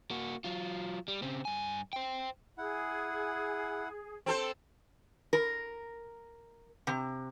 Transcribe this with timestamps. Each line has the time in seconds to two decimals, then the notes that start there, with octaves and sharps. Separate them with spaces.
0.11 A#3 F#4
0.44 F#3 F4
1.08 G3
1.22 C#3 C4
1.45 G2 G#5
1.93 C5 G5
2.58 E4 G#4 F#5
4.26 C4 A4 C5
5.33 A#4
6.87 C3